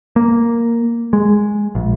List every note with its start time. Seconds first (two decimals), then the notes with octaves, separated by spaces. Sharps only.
0.16 A#3
1.13 G#3
1.75 A#1